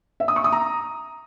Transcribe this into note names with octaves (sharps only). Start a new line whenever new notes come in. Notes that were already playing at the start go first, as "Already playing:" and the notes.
E5
D#6
C#6
D#6
A#5